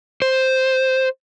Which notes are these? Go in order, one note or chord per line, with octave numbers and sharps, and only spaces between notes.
C5